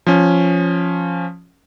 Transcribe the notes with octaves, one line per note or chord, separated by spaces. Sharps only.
F3 C#4